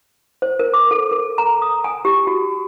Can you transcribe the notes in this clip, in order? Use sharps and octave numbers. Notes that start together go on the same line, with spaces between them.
C5
A#4
D6
A4
A#4
A#5
D#6
G#5
G4
F#4